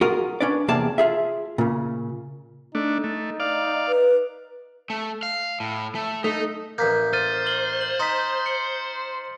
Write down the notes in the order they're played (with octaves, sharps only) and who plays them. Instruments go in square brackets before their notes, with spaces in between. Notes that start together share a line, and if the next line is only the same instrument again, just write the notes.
[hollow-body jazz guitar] F4 F#4 G#4 A#4
C#4 D4 B4 D5
E2 C3 A#3 G#4 D5 A5
F4 G#4 E5
A#2 C#3
[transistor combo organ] A3 D4 [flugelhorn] D#4
[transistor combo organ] A3
D5 F5
[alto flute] B4
[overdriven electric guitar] A3
F5
A2
A3
[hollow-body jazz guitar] A3 [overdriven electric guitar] D#4
[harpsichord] A1 A#3 [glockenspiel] G6 B6
[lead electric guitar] C5 [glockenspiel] F6 A6 D#7
[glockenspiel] F6 F#7 G7
F#7
[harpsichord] D#4 [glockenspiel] C6 B6
[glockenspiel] C#7 F#7